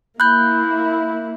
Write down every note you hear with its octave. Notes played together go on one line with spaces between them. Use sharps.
A#3 E4 B5 F#6 G6